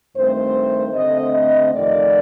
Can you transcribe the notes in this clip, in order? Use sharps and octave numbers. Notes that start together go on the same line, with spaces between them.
G2 D#3 A3 C4 C5
D3 A3 C4 D#5
D#5
F2 C3 D#3 A3 D5